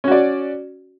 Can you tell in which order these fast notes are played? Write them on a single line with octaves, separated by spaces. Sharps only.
C#4 F#4 D5